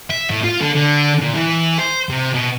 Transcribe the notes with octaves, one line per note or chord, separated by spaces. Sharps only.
E5
A2
F4
D3
D3
A#2
E3
C5
C3
B2